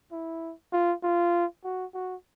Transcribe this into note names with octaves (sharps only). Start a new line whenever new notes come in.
E4
F4
F4
F#4
F#4